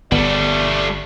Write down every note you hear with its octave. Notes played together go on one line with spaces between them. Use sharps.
G1 G3 A3 B3 D5